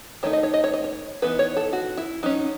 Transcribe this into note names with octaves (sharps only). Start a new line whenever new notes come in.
D#3 A3 D#4 C#5
D#5
C#5
D#5
C#5
D#5
C#5
E3 B3 D#4 B4
C#5
A4
F#4
E4
F#3 C#4 D#4